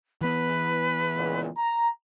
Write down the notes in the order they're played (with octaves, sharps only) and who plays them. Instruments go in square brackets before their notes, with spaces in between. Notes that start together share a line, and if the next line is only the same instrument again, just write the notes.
[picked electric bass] E3 B3 [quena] B4
[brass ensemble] C#2 A#2
A#5